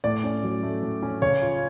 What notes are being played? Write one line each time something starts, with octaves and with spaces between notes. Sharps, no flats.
A2 D5
C#4
F#3
A3
A2
C#4
C#3 C#5
F4